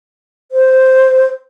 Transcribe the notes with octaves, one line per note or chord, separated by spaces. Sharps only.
C5